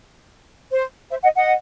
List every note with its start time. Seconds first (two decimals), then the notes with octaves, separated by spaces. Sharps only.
0.70 C5
1.10 C5 E5
1.22 D#5 F#5
1.36 D#5 F#5